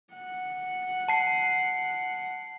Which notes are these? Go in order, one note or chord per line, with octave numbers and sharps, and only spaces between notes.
F#5
A5 C7